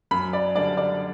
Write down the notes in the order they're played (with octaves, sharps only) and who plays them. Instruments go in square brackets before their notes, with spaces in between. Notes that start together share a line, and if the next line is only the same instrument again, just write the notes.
[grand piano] F#2 [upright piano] B5
[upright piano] D5
[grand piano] D3 G3 D4 [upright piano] D5
[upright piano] D5